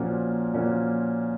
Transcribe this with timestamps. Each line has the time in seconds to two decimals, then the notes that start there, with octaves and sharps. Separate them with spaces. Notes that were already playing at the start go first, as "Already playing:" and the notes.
Already playing: A#2 F3 A#3 C#4 F#4
0.54 A#2 F3 A#3 C#4 F#4